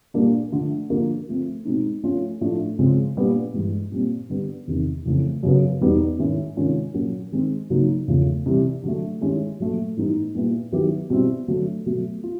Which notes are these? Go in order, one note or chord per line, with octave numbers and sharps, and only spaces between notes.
A#2 G3 A#3 D4
D3 F3 A3 D4
D3 F3 A#3 D4
F3 A3 C4
B2 G#3 C4 D#4
F3 A3 C#4 F4
A2 F3 A3 D4
C#3 F3 G#3 C4
A#2 G3 B3 D4 F4
G2 E3 G#3
A#2 G3 C4
D3 G3 B3
E2 C3 D#3
F2 C#3 E3 A3
F#2 C#3 F#3 B3
E2 B2 G3 B3 D#4
G#2 D#3 G#3 C#4 E4
C3 D#3 G#3 C#4 F4
A#2 F#3 A#3 C#4 F#4
D#3 G#3 C4
C#3 F#3 A#3 D#4
E2 C#3 F3 A3
C3 E3 G3
D3 F#3 A3
D#3 G#3 C#4 E4 G4
A#2 F#3 A3
A2 E3 G3 B3 D#4
A#2 G3 B3 E4
D#3 F#3 B3 E4 G4
B2 G3 C4 E4
D3 F#3 A3
B2 F#3 A3
F4